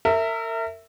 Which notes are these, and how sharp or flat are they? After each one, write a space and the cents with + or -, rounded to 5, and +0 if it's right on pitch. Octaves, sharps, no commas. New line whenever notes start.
A#4 -35 E5 +0